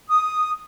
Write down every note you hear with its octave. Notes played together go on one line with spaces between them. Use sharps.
D#6